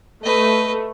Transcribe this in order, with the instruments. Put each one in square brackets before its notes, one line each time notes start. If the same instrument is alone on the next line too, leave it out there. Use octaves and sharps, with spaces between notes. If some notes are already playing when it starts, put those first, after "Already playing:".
[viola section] A3 [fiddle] B4 D#5